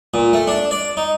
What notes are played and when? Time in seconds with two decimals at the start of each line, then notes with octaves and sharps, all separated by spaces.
0.14 A#2
0.33 A3
0.47 D4
0.71 D5
0.97 D#4